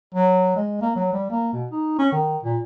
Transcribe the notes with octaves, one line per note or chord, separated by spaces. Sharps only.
F#3
G#3
A#3
F#3
G3
A#3
B2
D#4
C#4
D#3
A#2